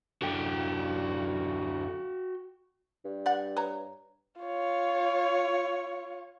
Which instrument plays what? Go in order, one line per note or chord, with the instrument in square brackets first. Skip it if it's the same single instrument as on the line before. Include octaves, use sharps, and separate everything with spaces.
[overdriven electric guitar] F#2 D3 [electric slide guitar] F#4 G5
[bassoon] G2
[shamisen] D5 F#5
B4 C#5 A#5
[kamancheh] F4 C#5